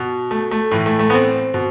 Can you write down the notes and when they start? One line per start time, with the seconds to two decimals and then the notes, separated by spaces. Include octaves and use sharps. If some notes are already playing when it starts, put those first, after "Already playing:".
Already playing: B2
0.31 A3
0.51 A3
0.71 A2 E3
0.86 A3
0.99 A3
1.10 B3
1.14 C4
1.54 B2